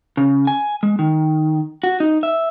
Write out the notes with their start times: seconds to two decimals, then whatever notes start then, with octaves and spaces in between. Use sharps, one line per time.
0.17 C#3
0.47 G#5
0.83 G#3
0.99 D#3
1.83 F#4
2.00 D#4
2.23 E5